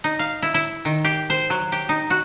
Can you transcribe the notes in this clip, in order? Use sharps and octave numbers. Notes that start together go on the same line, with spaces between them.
D#4
F5
E4
E4
D#3
G4
C5
F#3
G4
D#4
F#4